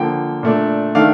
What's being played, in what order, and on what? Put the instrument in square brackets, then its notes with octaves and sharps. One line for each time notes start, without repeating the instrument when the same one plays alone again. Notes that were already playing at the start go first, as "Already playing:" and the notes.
Already playing: [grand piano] D3 F3 A#3 G5
A#2 A3 D4
D#3 A3 D4 F5